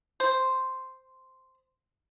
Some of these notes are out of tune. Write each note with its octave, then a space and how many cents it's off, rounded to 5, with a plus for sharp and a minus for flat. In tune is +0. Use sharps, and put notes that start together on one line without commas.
C5 -5